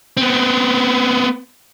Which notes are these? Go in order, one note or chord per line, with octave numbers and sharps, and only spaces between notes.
B3 C4